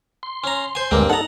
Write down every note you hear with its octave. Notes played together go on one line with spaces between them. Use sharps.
C6
C#4 A#5
C5 G#5
D2 G2 G#3 A#3 C4 D6
D#4 A4 F#5 A5 A#5